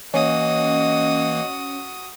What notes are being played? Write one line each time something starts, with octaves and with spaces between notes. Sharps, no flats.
E3 A#3 C#4 F#4 D#5 D#6